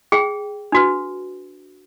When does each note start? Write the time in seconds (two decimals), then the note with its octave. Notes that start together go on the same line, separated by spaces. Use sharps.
0.12 G#4 G5
0.72 D4 F#4 B4